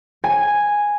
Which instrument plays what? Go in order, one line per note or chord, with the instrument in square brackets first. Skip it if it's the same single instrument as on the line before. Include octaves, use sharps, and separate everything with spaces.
[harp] G#5